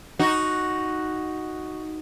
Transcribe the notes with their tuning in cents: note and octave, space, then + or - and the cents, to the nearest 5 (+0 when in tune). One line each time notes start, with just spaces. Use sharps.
D#4 +0 F#4 +0